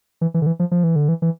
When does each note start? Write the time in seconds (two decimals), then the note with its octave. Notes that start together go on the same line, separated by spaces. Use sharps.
0.21 E3
0.34 E3
0.42 D3
0.46 E3
0.59 F3
0.71 F3
0.84 E3
0.96 D3
1.08 E3
1.22 E3